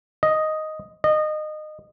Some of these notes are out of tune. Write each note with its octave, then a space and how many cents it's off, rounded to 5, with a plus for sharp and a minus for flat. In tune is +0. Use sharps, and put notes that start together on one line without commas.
D#5 +0
D#5 -25